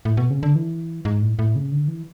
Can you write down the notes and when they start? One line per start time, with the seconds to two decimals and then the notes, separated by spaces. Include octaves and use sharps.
0.05 A2
0.17 B2
0.30 C#3
0.43 D3
0.56 E3
1.05 G#2
1.22 A2
1.39 A2
1.56 C#3
1.72 D3
1.88 E3